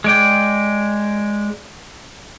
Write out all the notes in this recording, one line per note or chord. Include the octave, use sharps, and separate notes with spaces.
G#3 D5 G5